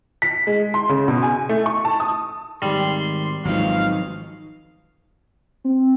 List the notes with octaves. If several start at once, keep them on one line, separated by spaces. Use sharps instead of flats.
B6
G#3
C6
C#3
B2
G#5
A3
C#6
A5
D#6
G#2 D#3 G3 C6
G#1 F3 F#3 D#4 F5
C4